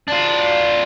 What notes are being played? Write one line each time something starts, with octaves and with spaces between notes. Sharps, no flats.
D4 F4